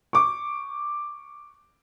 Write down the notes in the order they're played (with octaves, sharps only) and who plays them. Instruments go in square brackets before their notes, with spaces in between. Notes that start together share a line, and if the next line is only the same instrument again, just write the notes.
[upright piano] C#6 D6